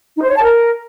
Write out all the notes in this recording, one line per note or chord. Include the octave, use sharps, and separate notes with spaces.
D#4
C5
C#5
A5
A#4